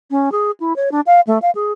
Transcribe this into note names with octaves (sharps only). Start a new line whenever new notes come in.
C#4
G#4
E4
C#5
D4
F5
A3
F5
G#4